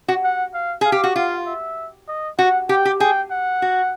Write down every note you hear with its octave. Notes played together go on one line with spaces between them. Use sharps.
F#4
F#5
F5
G#4 F5
G4
F#4
F4 F5
E5
D#5
F#4 F#5
G4 G5
G4
G#4 G5
F#5
F#4